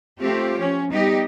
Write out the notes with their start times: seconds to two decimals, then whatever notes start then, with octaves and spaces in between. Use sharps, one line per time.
0.20 A3 C4 F4 G4
0.58 F3 C#4
0.92 G3 B3 D#4 G4 D#5